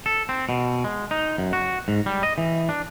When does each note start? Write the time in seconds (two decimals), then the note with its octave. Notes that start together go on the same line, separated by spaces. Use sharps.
0.06 A4
0.29 C4
0.49 B2
0.84 G#3
1.11 D#4
1.38 F#2
1.53 F#4
1.88 G#2
2.06 G3
2.23 D#5
2.38 E3
2.69 D4